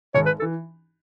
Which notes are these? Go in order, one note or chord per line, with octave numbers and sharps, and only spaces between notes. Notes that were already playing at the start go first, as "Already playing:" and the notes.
G#1 C#5
B4
E3 A4